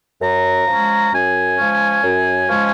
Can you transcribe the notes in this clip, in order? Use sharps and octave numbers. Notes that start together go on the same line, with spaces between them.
F#2 A#5
F3 G#3 C#4
F#2 G#5
F3 G#3 C#4
F#2
F3 G#3 C#4